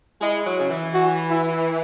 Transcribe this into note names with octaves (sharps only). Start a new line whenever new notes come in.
G#3 E4
F#3
C#3
E3
F#4
E4